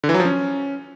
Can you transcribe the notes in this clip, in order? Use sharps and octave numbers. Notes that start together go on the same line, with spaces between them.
D3
E3
F#3
F3
C#4